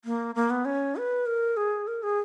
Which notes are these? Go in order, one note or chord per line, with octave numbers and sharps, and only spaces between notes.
A#3
A#3
B3
C#4
B4
A#4
G#4
A#4
G#4